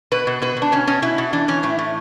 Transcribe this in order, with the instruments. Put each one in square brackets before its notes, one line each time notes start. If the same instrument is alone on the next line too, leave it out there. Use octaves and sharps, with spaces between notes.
[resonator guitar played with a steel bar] B2 B4
B2
B2 B4
B2
D4
B2 C#4
B2 C#4
B2 E4
B2
E3 D4
E3 C#4
A2 E4
A2